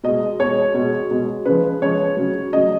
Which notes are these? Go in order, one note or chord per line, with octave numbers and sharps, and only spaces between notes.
B2 G#3 D#5
B2 G#3 C#5
B2 G#3
B2 G#3
C#3 F3 G#3 B4
C#3 F3 G#3 C#5
C#3 F#3
C#3 F#3 D#5